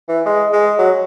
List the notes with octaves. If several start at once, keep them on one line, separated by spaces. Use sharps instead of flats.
E3
G#3
G#3
F#3